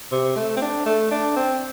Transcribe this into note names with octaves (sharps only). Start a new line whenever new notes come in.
C3
A3
C4
D4
A3
D4
C4